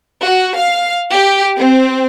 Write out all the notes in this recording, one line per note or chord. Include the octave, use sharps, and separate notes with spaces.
F#4
F5
G4
C4